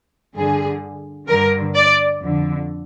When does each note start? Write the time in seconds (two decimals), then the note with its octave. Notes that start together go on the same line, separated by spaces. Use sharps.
0.35 G2 D3 G#4
1.28 G2 D3 A#4
1.75 D5
2.20 F2
2.25 D3